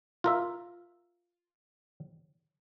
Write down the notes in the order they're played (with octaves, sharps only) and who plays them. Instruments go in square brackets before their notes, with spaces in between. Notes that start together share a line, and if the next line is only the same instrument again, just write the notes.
[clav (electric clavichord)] F4 A#4 E5